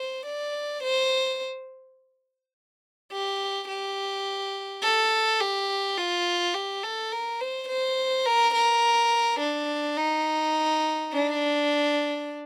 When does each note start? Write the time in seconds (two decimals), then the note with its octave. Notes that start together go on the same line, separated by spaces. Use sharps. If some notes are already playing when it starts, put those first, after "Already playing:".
Already playing: C5
0.26 D5
0.83 C5
3.12 G4
3.68 G4
4.83 A4
5.41 G4
5.98 F4
6.54 G4
6.83 A4
7.12 A#4
7.41 C5
7.69 C5
8.26 A#4
8.54 A#4
9.40 D4
9.97 D#4
11.12 D4